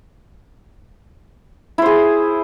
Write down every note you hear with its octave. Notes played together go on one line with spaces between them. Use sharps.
E4 G#4 C5